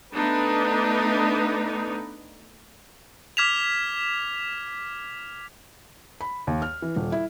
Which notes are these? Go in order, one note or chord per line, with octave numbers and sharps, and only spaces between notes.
A3 B3 D4 D#4 B4
D6 F6 G#6 B6 E7 F7
B5
D#2
F6
E3
D#1
E4